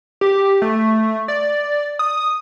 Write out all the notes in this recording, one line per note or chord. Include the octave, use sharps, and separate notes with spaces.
G4
A3
D5
D#6